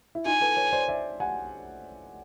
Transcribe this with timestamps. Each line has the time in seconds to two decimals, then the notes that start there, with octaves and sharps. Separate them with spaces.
0.15 E4
0.25 D#4 F4 G#5
0.41 A4 B4
0.57 B4 C#5
0.73 C5 D5
0.88 D5 E5
1.20 F#5 G#5